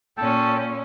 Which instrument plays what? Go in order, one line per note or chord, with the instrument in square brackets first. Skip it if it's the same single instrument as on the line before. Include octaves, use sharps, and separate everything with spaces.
[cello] A#2 C#4 [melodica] A4 G5 A5